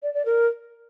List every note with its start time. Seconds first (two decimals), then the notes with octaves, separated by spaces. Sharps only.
0.03 D5
0.14 D5
0.25 A#4